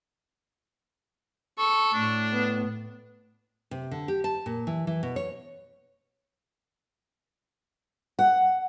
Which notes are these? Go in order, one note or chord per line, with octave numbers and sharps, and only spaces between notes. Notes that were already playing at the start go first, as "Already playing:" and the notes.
A4 C#6
A2 D4
B3
C3
D3
G4
A5
A#2
E3
E3
B2
C#5
F#5